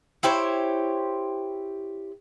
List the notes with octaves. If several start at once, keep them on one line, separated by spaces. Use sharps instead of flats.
E4 G4 C5 C#5